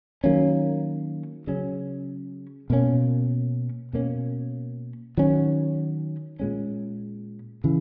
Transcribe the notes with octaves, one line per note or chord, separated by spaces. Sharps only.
D#3 F#3 A#3 C#4
C#3 F#3 C#4
B2 A#3 C#4
B2 A#3 C#4
D#3 F#3 C#4
A#2 G#3 C#4
C#3 E3